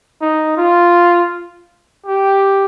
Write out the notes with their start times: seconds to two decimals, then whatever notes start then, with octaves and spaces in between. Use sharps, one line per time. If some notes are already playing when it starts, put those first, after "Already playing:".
0.21 D#4
0.57 F4
2.06 G4